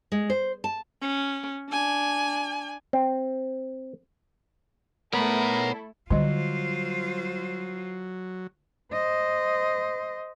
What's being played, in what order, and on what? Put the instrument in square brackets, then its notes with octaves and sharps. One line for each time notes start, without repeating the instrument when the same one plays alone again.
[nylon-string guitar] G#3
C5
A5
[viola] C#4
D4 G#5
[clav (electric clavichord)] C4
[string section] A3 E4 A4 [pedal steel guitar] B3 [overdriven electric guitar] A#4 [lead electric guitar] C#5 B5
[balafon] D3 D#5 [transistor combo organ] F#3 [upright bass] G3 [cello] F4 C5
[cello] C5 D#5